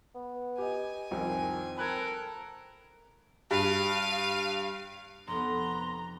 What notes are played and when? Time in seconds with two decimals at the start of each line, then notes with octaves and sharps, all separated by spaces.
0.15 B3
0.58 G4 D#5 G#5
1.11 C2 F2 D#3 C4
1.77 A4 A#4 B5 F#6 G#6
3.51 G2 F5 D#7
5.27 F1 B3 A#5 C6